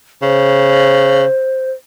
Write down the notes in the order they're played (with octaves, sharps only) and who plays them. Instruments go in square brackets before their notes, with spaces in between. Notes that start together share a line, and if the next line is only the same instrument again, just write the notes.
[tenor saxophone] C#3 [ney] C5